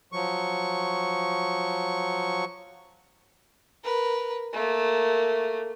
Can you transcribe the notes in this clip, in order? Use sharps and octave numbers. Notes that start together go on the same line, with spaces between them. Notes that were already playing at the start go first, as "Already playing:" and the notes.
F3 F#3 C#6
A#4 B4
A3 A#3